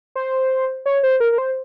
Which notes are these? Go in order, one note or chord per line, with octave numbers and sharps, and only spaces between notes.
C5
C#5
C5
A#4
A#4
C5